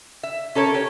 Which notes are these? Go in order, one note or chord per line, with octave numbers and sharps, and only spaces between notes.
E5
C#4 A4 A#4 C#5
G4